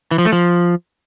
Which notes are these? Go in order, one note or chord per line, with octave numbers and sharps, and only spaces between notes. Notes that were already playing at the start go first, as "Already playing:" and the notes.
E3
F3
A3
F3